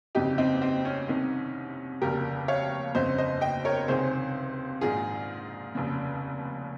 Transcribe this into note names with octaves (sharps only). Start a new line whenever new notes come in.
G1 F2 C#3 D#4 G4
C4 D#4
C4
C#4
C2 C3 D#3
F1 D#2 C#3 G4 A#4
C#5 F5
G1 F2 C#3 C5 D#5
C5 D#5
D#5 G5
A#4 C#5
C#2 C3 D#3 G#4 C5
A#1 G#2 D#3 F4 G#4
F1 D#2 C#3